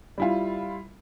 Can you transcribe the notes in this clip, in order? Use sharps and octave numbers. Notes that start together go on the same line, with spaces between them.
G3 E4 F4